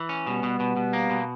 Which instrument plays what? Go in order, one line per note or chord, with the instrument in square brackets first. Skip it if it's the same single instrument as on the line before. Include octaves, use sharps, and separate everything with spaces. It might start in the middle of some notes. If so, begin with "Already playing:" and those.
Already playing: [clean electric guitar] E3
C#4
[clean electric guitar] B2 [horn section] G3 B3
[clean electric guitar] B2
B2
B2
A#3
B2